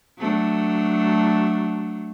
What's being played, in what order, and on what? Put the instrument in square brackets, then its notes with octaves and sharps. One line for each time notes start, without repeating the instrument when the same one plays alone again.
[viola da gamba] F#3 A3 D4